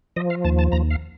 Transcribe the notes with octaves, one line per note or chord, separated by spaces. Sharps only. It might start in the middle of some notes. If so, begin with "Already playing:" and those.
F3 D#5
F5
D#2 A5
A5
D#2 A#5
F5